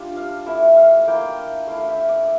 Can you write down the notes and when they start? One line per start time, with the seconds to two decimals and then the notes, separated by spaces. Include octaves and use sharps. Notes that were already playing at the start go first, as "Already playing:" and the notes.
Already playing: G3 D4 F4
0.16 F5
0.46 A3 E4 E5
0.76 F5
1.07 A#3 E4 G5
1.67 A3 E4 F5
1.88 E5
2.09 D5